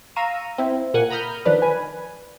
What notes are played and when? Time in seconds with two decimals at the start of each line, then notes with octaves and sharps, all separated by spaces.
0.16 F5 A#5 C#6 E6 D#7
0.58 C4 E4
0.94 A#2 A#3 F#5 G#5
1.10 A#5 B5 D#6 F6 G6
1.45 D#3 F3 D4 B4
1.62 B4 G#5